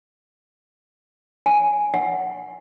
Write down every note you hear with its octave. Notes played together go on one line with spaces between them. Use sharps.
G#5
F#5